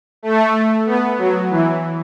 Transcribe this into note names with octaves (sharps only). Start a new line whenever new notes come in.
A3
B3
F#3
E3